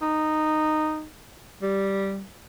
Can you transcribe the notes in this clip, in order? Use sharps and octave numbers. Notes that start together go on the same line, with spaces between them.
D#4
G3